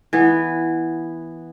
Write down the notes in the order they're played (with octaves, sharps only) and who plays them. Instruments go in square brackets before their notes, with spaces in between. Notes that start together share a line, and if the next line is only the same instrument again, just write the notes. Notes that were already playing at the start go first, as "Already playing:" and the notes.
[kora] E3 B3